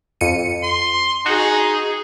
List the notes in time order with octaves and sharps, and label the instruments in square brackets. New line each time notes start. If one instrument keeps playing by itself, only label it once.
[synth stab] F2 C#7 D#7
[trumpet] C6
[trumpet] D#4 [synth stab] F#4 [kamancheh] G#4